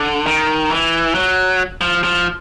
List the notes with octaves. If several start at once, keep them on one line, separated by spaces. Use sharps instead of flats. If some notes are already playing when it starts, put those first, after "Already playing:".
Already playing: D3
D#3
E3
F#3
F3
F3